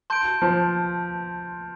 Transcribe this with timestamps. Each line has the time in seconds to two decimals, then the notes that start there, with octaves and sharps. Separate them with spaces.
0.10 A5 C6 G6 D7
0.42 F3